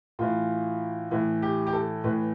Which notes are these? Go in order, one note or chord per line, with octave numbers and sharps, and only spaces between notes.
A2 E3 F4
A2 E3
G4
G4
A4
A2 E3 B4